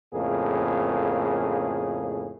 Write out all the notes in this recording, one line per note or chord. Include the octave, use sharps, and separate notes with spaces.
F2 A2 C#3 A#3 G#4